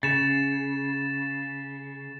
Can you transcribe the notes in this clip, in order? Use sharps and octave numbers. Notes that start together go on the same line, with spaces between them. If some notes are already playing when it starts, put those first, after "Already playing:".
C#3 A6 E7